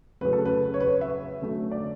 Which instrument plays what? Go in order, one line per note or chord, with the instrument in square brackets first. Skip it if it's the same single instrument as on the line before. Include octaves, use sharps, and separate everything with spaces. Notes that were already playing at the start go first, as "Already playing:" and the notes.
[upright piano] C#3 F#3 A3 B4
A4
B4
C#5
B4
E5
D3 F#3 A3
D5